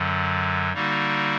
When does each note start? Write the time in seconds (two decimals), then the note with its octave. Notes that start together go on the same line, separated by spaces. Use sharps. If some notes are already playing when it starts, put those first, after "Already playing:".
Already playing: F#2 D3 F#3
0.73 D3 G3 A#3 D#4 F#4